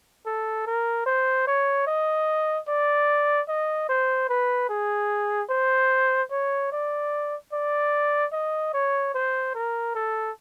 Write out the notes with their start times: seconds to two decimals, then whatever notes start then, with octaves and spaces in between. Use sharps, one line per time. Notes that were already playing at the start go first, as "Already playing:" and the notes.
0.26 A4
0.67 A#4
1.06 C5
1.47 C#5
1.87 D#5
2.68 D5
3.48 D#5
3.89 C5
4.29 B4
4.69 G#4
5.50 C5
6.31 C#5
6.72 D5
7.53 D5
8.33 D#5
8.74 C#5
9.14 C5
9.55 A#4
9.95 A4